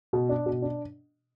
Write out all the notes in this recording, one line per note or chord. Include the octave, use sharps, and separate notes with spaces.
B2
D4
B2
D4